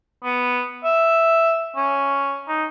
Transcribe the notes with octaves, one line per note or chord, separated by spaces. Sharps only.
B3
E5
C#4
D#4